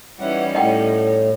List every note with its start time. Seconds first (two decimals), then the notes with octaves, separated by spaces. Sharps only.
0.20 E3 G3 C#4 D#4 E4 F#5
0.55 A2 D#5 F#5 G5